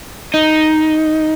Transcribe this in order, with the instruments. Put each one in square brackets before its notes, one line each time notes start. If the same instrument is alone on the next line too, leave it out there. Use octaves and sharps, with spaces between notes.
[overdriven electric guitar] D#4